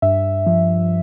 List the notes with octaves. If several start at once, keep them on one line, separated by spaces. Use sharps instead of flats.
G2 E5
F3